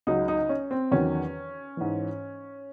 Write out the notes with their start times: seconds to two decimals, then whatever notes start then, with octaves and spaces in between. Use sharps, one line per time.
0.07 C#2 C#3 F#3 D#4
0.28 D#4
0.49 C#4
0.71 C4
0.92 E2 D#3 F#3 C#4
1.77 G#2 E3